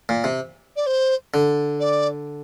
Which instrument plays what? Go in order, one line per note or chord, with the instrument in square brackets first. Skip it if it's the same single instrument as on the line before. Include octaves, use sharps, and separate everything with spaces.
[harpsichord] A#2
C3
[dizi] D5
C5
[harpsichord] D3
[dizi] D5